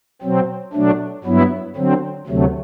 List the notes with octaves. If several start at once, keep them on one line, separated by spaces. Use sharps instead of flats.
B2 F#3 C4
B2 F#3 A3 D4
G2 F#3 B3 E4
D3 F#3 C4
D2 C3 F#3 A3